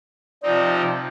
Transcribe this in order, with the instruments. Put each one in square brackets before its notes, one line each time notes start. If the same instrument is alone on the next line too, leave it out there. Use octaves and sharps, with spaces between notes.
[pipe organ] C3 F3 C4 D#4 [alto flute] D5